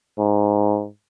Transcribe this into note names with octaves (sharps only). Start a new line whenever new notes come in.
G#2